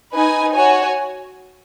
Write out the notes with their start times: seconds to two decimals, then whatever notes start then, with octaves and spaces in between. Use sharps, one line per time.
0.12 D#4 B4 G#5
0.53 F#4 C#5 G#5